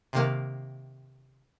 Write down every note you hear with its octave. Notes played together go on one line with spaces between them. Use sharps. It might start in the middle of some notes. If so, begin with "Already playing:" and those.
C3 D#3 A#3